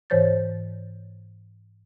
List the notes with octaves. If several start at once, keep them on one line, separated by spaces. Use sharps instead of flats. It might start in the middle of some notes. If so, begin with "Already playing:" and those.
G#2 E3 C5 C#5 G6 A6